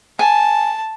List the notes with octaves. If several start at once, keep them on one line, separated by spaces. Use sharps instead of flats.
G#5 A5